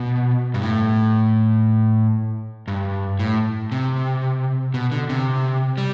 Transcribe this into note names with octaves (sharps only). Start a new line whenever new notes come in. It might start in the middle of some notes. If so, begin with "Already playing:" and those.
Already playing: B2
G2
A2
G2
A2
C3
B2
D3
C3
G3